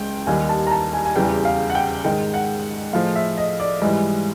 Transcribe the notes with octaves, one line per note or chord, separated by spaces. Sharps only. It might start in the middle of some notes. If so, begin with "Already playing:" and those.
Already playing: C#2 C#3 G5
D#2 D#3 G3 G#5
A5
A#5
A5
G#5
G#5
E2 C#3 E3 G3 G5
F5
F#5
G5
G#2 D#3 G#3 G5
F#5
A2 F3 G#3 F5
E5
D#5
D5
G#2 E3 G3 D#5